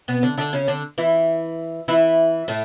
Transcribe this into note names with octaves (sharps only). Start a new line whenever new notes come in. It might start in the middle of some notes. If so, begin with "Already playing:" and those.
B2 B3
D3 D4
D3 D4
C#3 C#4
D3 D4
E3 E4
E3 E4
A2 A3